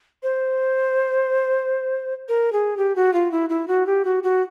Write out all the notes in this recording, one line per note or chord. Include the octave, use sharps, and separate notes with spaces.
C5
A#4
G#4
G4
F#4
F4
E4
E4
F#4
G4
F#4
F#4